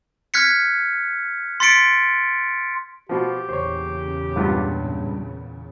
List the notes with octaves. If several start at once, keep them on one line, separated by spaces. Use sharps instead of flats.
F6 F#6 G#6 B6 C#7
C6 A6 B6 C#7 D7
B2 F3 G4
E2 A#2 C#3 C5 C#5
C#2 G2 B3 F4